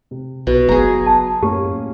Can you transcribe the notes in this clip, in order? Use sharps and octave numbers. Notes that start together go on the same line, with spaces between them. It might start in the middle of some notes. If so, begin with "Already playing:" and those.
C3
B1 B2
F#1 F#3 B3 F#4 G#4 A#5
A5
F#2 A2 A#3 C#4 G4